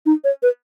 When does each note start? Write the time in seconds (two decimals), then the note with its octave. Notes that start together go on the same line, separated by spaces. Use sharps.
0.06 D#4
0.24 C#5
0.43 B4